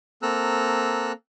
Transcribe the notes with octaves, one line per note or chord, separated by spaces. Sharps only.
A#3 C4 A4 A#5 E6 F#6